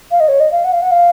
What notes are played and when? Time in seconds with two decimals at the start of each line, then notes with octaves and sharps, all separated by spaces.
0.11 F5
0.20 D#5
0.28 C#5
0.40 D#5
0.52 F5
0.64 F#5
0.72 F5
0.82 F#5
0.91 F5